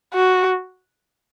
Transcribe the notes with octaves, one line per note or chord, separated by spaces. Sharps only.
F#4